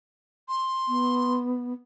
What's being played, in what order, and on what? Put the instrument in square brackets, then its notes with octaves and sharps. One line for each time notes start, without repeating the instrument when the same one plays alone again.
[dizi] C6
[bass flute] B3